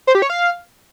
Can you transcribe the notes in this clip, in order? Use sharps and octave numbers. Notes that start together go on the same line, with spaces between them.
C5
G4
C#5
F5